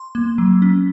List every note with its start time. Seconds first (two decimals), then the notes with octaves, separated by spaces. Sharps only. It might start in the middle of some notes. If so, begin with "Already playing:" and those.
Already playing: C6
0.15 A#3
0.38 F#3
0.62 C#4